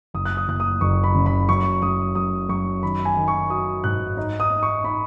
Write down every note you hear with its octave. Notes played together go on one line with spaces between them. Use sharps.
F#1 D#6
F#6
D#6
F#1 F#6
D#6
F#1 C#6
B5
C#3
B5
F#2 C#6
F#2 D#6
F#2 D#6
F#2 C#6
D#3 B5
G#5
D#3
C#6
F#3 D#6
G#2 F#6
D#4
D#6
D#4
C#6
D#4 B5